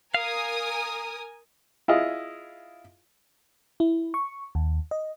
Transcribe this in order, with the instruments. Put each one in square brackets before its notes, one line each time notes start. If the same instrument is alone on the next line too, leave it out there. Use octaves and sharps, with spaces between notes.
[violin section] A#4 G#5 D#6 [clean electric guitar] F5
[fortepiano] E4 F4 G#4 D#5
[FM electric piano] E4
C#6
D#2
D#5